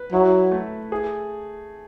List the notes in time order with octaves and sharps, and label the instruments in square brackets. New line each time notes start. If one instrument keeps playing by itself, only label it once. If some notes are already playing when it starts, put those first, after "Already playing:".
Already playing: [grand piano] B4
[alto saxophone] F#3 [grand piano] E4
[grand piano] A3
G#4